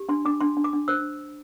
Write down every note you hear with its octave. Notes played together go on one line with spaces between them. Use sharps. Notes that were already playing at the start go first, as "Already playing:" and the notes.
Already playing: G4
D4 C6
D4 D6
D4 C6
D4
D6
D4
C5 E6